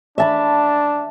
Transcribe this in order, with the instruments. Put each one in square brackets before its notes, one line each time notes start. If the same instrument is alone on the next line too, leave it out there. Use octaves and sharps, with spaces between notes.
[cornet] D4 [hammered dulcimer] E5 A5 B5